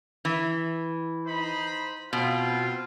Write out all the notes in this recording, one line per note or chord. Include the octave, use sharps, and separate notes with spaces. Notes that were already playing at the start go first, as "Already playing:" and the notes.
E3
D#4 C5 B5
B2 C4 F4